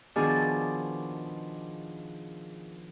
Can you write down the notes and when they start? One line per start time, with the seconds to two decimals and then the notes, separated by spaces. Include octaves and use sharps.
0.16 B2 D#3 F3 D4 G#4 D5